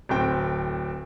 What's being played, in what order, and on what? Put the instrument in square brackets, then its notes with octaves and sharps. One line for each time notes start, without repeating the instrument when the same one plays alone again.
[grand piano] D1 A2 C4 G5